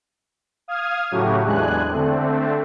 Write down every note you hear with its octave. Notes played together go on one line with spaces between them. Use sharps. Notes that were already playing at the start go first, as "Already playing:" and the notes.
F5 D#6 F6 G#6
A2 C#3 F#3 A3 F#4 G4
E2 G#3 D4 G#5 F#6
D3 A3 C4